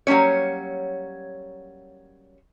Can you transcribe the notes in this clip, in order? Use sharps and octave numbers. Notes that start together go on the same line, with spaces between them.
F#3 G3 A#3 C#4 C#5